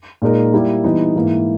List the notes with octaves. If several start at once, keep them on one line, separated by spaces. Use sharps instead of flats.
A#2 G#3 D#4 A#4
G3 A#3 E4 G4
E3 G3 B3 D#4
G#2 E3 A#3 E4